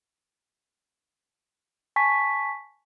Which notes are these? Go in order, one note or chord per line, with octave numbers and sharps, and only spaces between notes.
G#5 A5 C#6 B6